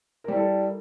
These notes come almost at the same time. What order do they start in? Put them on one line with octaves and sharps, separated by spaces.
A#4 G3 E4 A4